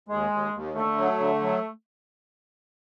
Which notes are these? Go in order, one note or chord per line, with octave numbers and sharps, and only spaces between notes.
D#2 G#3
D#2
D#2
D3 A3
F#3
D3
F#3